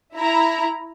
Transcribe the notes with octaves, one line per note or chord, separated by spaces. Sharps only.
E4 A#5